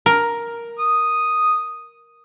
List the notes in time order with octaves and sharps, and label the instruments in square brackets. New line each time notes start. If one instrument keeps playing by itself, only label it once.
[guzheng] A#4
[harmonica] D#6